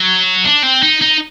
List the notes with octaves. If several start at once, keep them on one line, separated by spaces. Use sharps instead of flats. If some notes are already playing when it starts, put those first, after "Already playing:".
Already playing: F#3
D4
C4
D#4
D#4